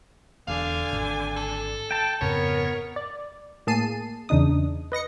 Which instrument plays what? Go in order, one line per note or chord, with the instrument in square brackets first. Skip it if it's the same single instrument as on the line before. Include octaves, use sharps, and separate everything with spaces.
[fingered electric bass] E1 [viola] D3 G#5 [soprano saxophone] F5
[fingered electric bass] G#1
[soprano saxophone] A4
[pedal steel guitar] G5 A5
[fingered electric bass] F2 G#2 C#3 [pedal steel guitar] B3 [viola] A#4 [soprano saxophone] C#5
[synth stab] D5
A2 A#3 G#4 A5 C7 D#7
E2 C#3 D4 D#4 D#6
B4 D#5 A#6 C#7